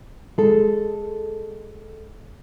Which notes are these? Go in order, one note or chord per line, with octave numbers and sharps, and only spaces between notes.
G#3 A4